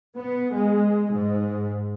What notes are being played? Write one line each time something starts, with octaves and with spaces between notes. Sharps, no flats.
B3
G#3
G#2